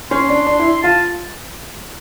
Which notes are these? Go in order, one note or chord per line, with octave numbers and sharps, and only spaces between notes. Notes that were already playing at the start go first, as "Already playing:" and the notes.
C#4 C6
D4
D4
E4
F4 A5